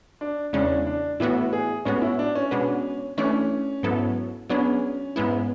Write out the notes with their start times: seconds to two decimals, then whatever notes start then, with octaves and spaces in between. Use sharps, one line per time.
0.21 D4
0.53 E2 C#3 G#3 C#4 D4
0.87 D4
1.20 A2 E3 B3 E4 F#4
1.53 G#4
1.85 A2 G#3 B3 C#4 F#4
2.02 E4
2.19 D4
2.35 C#4
2.51 B2 G#3 D4 F#4 B4
3.18 E3 A3 C#4 D4 A4 D5
3.83 G#2 F#3 B3 E4 A4
4.50 F#3 B3 C#4 D4 G#4
5.16 G#2 G#3 B3 E4